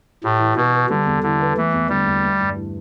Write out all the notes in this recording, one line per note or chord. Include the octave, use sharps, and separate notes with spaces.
A2 G4
E3
B2 B3
B4
D3 G3
E2
D3 E3
B3
E3 A3
E2
D3 G3
E2
A3
G2
E3